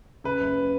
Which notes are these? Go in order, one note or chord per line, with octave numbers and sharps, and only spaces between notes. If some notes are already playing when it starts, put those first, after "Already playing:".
C#3 B4
F#1